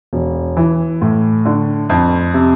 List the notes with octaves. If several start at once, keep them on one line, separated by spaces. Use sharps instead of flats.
E1
E3
A2
D3
F2
C3